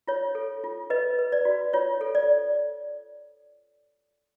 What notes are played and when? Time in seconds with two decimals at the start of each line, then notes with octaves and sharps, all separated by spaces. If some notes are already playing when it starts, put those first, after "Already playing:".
0.07 F4 C#5
0.35 A4
0.64 F4
0.90 B4 D#5
1.19 B4
1.32 D5
1.45 F#4
1.73 F4 C#5
2.01 A4
2.15 D5